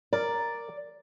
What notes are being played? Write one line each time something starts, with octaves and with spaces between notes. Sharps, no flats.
A#4 D5 A#5